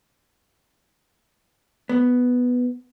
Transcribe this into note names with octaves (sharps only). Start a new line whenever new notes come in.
B3